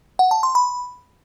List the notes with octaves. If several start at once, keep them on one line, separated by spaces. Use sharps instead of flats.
F#5
A5
C6
B5